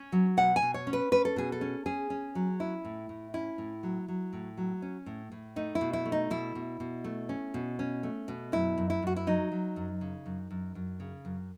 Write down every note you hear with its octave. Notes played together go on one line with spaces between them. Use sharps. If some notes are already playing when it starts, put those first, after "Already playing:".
Already playing: C#4
F#3
B2 F#5
G#5
B2
C#5
C#4
B4
C#4 B4
A4
B2 G#4
A4
C#4
C#4 G#4
C#4
F#3
C#4 E4
A2
A2
C#4 E4
A2
F#3
F#3
A2
F#3
C#4
A2
A2
A3 D#4
E4
B2
E4
A3
D#4
B2 E4
B2
B2
A3
C#4
B2
C#4
A3
B2
F#2 E4
F#2
E4
F#2 F#4
E4
F#3 D#4
F#3
F#2
C#3
F#2
F#2
F#2
C#3
F#2